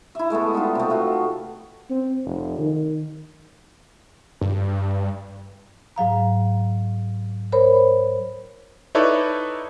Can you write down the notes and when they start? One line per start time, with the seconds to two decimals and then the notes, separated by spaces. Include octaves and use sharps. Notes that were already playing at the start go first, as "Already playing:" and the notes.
0.15 E4 E5
0.30 G#3 A3 B3 A4
0.53 G3 B3 D#4 F4
0.75 C3 A3
0.90 B3 F4 F#4
1.90 C4
2.25 F1
2.58 D#3
4.41 G2
5.96 G#2 F#3 F5 A#5
7.52 A#4 C5 C#5 B5
8.95 D#4 E4 A4 B4 C#5 D5